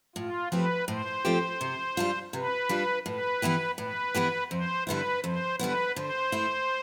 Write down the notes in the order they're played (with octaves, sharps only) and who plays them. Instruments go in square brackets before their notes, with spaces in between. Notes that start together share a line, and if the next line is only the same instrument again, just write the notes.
[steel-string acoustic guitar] A2 [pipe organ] F4
[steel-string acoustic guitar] F3 A3 C4 G4 [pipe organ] B4
[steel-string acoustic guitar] A2 [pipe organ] C5
[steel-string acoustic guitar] F3 A3 C4 G4
C3
G3 D4 F4
[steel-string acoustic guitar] C3 [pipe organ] B4
[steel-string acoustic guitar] G3 D4 F4
[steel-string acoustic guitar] A2 [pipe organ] B4
[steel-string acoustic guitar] E3 B3 E4 G4
[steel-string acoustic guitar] A2 [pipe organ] B4
[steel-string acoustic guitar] E3 B3 E4 G4
[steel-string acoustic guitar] F2 [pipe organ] C5
[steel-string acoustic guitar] D3 G3 B3 E4 [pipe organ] B4
[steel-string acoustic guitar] F2 [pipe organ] C5
[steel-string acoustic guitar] D3 G3 B3 E4 [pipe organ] B4
[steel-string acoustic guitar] D3 [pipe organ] C5
[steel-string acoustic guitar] A3 E4